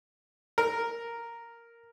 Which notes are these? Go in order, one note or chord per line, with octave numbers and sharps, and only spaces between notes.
A#4